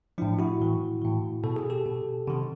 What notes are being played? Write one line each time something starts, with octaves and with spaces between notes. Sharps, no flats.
A2 F3 D4 E4
E4 F#4
A2 E3
A2 E3
B2 A4
G#4
G4 A4
B2
C3 D#3